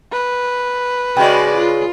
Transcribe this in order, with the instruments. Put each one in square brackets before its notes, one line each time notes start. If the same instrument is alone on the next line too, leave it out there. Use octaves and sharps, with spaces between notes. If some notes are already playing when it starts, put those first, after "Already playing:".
[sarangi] B4
[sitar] C#3 G#3 [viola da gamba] F#4 D5 [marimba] G5
[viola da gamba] F4